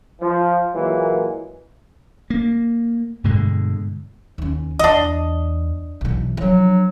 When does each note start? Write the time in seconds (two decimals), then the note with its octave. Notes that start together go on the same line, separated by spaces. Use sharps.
0.21 F3
0.74 A#2 E3 F#3 G#3 A#3
2.30 A#3
3.24 G2 B2 D3 G#3
4.38 D#2 C#4
4.79 E2 D4 D#5
6.01 B1 E3
6.37 F3 F#3 D4